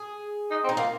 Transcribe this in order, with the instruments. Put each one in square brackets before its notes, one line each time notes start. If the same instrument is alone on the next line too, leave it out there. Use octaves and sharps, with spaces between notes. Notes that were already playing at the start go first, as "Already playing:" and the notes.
Already playing: [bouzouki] G#4
[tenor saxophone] D#4
C4
[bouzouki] D#4
[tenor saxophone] A#3 [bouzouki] F4